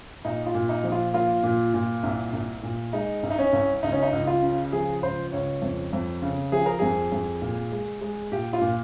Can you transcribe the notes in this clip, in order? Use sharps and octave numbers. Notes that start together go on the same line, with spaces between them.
A#2 D#4
F4
A#2
D#4
F3
F4
A#3 F4
A#2
A#2
C2
C2
A#2
G#3 D#4
C2
D#4
C#4
C2
C#2 D#4
C#4
D#4
C#2
F4
C#3
F3 G#4
C#2 C5
C#2 C#5
F2
F2
C#3
F3 G#4
A#4
F2 G#4
F2
A#2
G#3
G#3
A#2 G4
F4
A#2